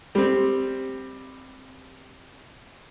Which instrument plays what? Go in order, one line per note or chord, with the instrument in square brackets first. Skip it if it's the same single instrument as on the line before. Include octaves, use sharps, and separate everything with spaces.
[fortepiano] G3 C4